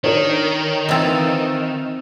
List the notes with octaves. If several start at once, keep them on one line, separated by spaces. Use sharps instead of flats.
D#3 D4 A#4 C#5
E3 C4 F4 D#5 E6 A6